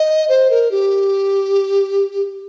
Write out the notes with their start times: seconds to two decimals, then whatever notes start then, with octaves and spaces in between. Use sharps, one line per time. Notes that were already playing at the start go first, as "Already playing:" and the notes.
Already playing: D#5
0.29 C5
0.50 A#4
0.71 G4